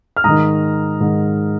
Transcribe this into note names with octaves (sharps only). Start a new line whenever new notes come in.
F6
G#2 D#3 A#5 D#6
G#2 D#3